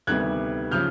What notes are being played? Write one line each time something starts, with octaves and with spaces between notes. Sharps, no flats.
D2 C3 D#3 G3 B3 F#6 G#6
C#3 F3 F6 G6